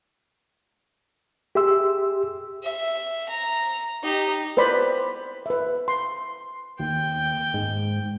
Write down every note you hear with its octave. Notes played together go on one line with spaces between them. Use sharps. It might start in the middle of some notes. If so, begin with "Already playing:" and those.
G4 G#4 E5 C6 E6
E5
A#5
D#4 G4
B4 C5 D5 B5
B4 E5
C6
D#2 G5
G#2